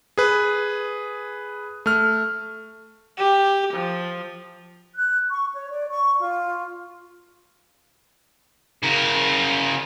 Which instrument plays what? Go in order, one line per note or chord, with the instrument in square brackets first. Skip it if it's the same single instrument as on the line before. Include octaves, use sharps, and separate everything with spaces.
[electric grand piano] G#4 B4
A3 F6
[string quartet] G4
F3
[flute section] F#6
C#6
C#5
D5
C#6
F4
[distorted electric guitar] C#3 A#4